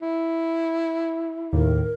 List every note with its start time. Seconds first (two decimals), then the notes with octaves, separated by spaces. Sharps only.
0.01 E4
1.53 D#2 A2 A#4